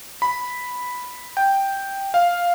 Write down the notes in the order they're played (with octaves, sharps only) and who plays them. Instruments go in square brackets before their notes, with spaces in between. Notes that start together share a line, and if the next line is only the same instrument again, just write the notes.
[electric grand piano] B5
G5
F5